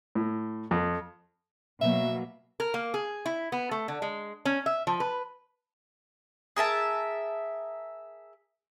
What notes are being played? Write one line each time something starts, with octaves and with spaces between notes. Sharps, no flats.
A2
F2
B2 F#3 A#3 E5
A#4
A#3
G#4
E4
B3
A3
D3
G#3
C#4
E5
F3
B4
G#4 A#4 E5 A5